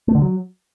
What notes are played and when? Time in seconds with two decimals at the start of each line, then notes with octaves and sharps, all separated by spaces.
0.08 A3
0.15 D3
0.22 F#3